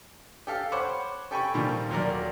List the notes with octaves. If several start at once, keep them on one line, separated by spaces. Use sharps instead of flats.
G4 A4 F5
C5 C#5 F#5 B5 C#6 D6
G4 A4 G5 G#5 B5 C#6
A#2 D#3 F3 G3 A#3
D#1 F#3 A#4 D5